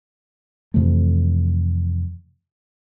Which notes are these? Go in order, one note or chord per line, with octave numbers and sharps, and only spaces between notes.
F2 C3 E3 A3